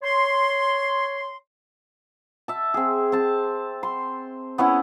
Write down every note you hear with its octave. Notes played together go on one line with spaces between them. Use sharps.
C#5 C6
E5 A5
C4 G#4
C4 A5
C6
B3 C#4 E4 F#5